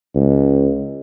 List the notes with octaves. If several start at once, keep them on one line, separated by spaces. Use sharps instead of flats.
C#2